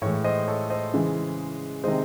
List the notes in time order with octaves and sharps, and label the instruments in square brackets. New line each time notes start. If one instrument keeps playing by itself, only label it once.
[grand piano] A2 C#5 E5
E3 G#3
C5 D#5
A4 C#5
C5 D#5
C#3 E3 G#3
C3 D#3 G#3 C5 D#5